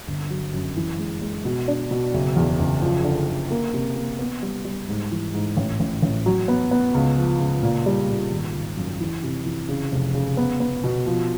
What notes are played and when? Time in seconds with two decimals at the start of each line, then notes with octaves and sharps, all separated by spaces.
0.08 G1
0.30 F#3
0.54 F#2
0.76 E3
0.99 G#3
1.22 G#3
1.45 B2
1.68 D4
1.91 B2
2.14 F#1
2.36 E2
2.59 F#1
2.82 F3
3.04 D3
3.28 D3
3.50 A#3
3.74 C3
3.96 A#3
4.19 B3
4.42 G3
4.65 G3
4.89 G#2
5.12 E3
5.34 G#2
5.57 A1
5.80 A1
6.02 A1
6.26 F#3
6.48 B3
6.71 B3
6.94 C#2
7.17 F3
7.40 C#2
7.63 A#2
7.86 G3
8.09 A#2
8.31 G#1
8.55 G#1
8.77 F#2
9.01 E3
9.23 C3
9.46 E3
9.69 C#3
9.92 F1
10.15 C#3
10.37 B3
10.60 B3
10.84 B2
11.06 F3